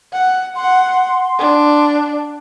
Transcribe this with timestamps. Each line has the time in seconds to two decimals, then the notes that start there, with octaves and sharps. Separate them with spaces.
0.13 F#5
0.56 F#5 C6
1.39 D4